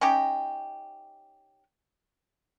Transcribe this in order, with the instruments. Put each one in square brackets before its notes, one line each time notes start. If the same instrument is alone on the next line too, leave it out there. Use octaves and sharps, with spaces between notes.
[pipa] C#4 D#4 G4